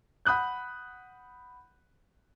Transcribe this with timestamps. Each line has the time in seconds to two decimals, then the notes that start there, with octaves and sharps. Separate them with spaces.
0.25 F#5 B5 D#6 F#6 G6